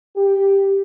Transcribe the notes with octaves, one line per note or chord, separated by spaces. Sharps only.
G4